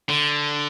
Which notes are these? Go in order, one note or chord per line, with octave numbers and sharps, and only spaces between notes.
D3